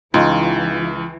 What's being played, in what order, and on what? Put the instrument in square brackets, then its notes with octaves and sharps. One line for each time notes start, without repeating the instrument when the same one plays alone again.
[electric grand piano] C#2 [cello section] E3 [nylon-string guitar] D#4 F4